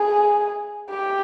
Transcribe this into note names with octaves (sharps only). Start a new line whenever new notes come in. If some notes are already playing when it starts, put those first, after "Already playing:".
Already playing: G#4
G4